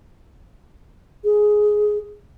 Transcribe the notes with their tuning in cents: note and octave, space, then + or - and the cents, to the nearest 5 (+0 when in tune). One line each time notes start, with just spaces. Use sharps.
G#4 +10